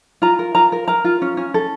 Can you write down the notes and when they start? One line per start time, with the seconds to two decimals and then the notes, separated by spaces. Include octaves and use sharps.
0.22 F4 A#5
0.39 A#4
0.55 F4 A#5
0.72 A#4
0.88 A#4 A#5
1.04 F4
1.22 C#4
1.37 C#4
1.54 A4